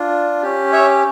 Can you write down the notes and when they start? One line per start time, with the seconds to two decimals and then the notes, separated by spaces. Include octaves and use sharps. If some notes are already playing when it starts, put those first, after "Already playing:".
Already playing: D4 F4
0.43 C#4 G4
0.73 C#5 E5